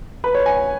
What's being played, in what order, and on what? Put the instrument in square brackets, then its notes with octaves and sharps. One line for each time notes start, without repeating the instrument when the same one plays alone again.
[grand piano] B4
C#5
G#5